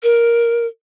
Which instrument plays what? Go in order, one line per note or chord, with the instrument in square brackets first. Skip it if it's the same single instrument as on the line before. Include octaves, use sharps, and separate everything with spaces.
[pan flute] A#4